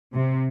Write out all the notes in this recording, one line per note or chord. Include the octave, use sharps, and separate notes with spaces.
C3